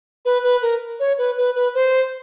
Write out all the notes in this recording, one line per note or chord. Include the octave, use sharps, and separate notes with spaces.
B4
B4
A#4
C#5
B4
B4
B4
C5